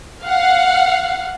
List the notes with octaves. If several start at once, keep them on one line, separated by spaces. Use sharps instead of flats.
F5 F#5